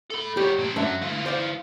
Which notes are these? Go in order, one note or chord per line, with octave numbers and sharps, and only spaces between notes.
A4 B5
G3 G4 C#5
A#2 D4
F#2 F#3 A3 D4 E5
E3 F4
C5 D5 F5